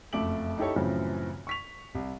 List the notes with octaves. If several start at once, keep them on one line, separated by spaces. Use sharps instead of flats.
F#1 F2 A3 D6 D7 F#7
D#4 E4 G4 A4 C#5
F#2 A2 C#3 E3 F3 C4
C#6 B6 F7
C2